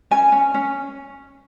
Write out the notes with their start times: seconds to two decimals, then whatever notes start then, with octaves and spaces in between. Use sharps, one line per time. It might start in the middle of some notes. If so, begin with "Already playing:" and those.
0.11 C#4 G#5
0.32 C#4
0.54 C#4